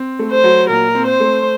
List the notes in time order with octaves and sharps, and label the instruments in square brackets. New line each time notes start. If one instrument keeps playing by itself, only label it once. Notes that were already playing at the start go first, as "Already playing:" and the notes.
Already playing: [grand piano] C4
A3
[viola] C5
[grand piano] F#3
[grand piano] A#2 [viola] A#4
[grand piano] C4
[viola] C5
[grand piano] A3